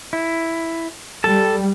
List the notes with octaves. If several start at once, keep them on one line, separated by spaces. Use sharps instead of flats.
E4
G3 A4 A5